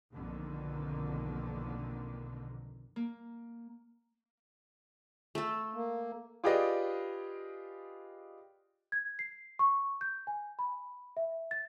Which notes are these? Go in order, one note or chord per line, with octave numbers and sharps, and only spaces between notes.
B1 F2 D3 D#3 A#3
A#3
A3 A4
A#3
F4 G4 G#4 B4 D5 D#5
G#6
C7
C#6
G6
G#5
B5
E5
A6